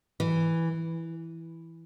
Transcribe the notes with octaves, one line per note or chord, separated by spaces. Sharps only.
E3